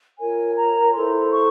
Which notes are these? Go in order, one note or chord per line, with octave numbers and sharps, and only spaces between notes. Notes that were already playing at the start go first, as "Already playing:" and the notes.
F4 A#4 C#5 G#5
A#5
E4 A4 C5 C6
C#6